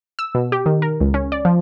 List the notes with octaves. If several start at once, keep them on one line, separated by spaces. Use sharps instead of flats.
E6
B2
G4
D#3
A#4
C#2
C#4
D5
F3